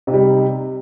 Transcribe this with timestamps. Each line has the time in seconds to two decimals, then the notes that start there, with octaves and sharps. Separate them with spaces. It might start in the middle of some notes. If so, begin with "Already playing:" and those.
0.07 C3
0.10 D#4
0.14 G3